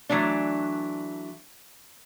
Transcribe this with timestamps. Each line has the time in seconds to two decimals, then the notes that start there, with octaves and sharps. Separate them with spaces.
0.09 E3 F#3 A3 D4